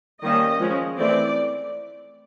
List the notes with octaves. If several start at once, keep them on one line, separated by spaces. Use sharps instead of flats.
D#3 G3 A#3 C#4 D#5
F3 G#3 C#4
E3 A3 C4 D5